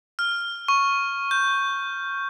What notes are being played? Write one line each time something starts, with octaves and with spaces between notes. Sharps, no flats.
F6
C#6
G6